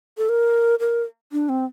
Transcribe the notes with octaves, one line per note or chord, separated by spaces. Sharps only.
A4
A#4
A#4
D4
C4